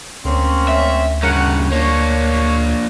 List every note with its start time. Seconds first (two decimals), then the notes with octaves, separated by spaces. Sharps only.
0.25 D2 A#3 C4 C#4
0.68 E5
1.23 G2 C#3 A#4 C#5 F#5
1.72 A#3 D4 C#5